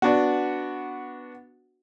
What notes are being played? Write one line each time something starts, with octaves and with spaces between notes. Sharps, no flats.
B3 D4 F#4